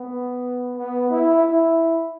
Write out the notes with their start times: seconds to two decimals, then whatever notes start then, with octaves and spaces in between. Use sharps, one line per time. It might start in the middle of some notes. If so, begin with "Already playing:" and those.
Already playing: B3
0.77 B3
1.10 E4
1.43 E4